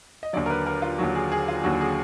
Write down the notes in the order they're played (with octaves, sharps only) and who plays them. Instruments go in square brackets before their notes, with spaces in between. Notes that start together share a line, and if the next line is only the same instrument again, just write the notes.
[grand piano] D#5
D#2 D3 F#3 D5
A#4
B4
A#4
F4
D#2 D3 F#3 F#4
G#4
G#4
F4
D#2 D3 F#3 F#4
G#4